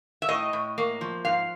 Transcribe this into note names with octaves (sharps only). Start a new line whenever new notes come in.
E5
A2 D#5
A2
A#3
F3
G#2 F5